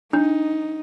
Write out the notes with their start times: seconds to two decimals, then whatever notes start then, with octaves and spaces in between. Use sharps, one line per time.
0.13 D4 D#4